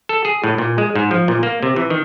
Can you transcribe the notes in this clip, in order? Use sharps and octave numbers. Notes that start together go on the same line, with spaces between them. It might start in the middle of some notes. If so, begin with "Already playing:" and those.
A4
G#4
A2
A#2
G#3
G#2
F3
A#2
A#3
C3
E3
D#3